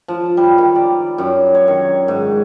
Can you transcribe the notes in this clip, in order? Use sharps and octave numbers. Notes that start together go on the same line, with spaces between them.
F3
G3
D#3
D5
F#2
C#5
D#3
G#2